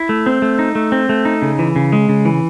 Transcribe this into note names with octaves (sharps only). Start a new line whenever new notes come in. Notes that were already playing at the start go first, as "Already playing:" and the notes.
Already playing: E4
A3
C4
A3
D#4
A3
C4
A3
D#4
C#3
E3
C#3
G#3
C#3
E3